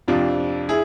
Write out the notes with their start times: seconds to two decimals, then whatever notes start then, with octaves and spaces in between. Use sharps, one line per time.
0.08 F2 C3 F3 D4 F4
0.69 E4 G#4